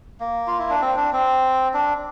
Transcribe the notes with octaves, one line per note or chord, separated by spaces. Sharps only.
A#3
F4
E4
D4
C4
D4
C4
D4